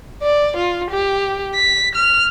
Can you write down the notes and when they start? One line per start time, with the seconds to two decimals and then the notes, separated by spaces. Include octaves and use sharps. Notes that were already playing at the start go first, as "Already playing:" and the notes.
0.22 D5
0.57 F4
0.91 G4
1.55 B6
1.95 F6